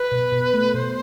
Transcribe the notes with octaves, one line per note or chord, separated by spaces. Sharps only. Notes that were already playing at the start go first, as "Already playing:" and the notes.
Already playing: B4
B2
B2
A3
B2 C5